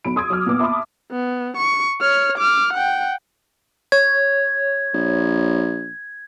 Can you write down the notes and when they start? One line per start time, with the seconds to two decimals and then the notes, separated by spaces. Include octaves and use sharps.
0.05 B1 B5 D7
0.16 C6 D#6 E6 G#6
0.30 F#3 D6 F6
0.46 A#2 B3 D6
0.59 E5 A5 B5 C6 D6 D#6
1.12 B3
1.57 C#6
2.01 C#5 F6
2.38 D6 F6
2.74 F#5 G5
3.92 C#5 G#6
4.94 A#1